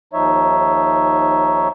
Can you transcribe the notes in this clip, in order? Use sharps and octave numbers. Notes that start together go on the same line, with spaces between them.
D#2 F3 D#4 C#5 E5